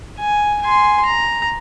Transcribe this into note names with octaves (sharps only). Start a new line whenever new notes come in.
G#5
G#5 C6
A#5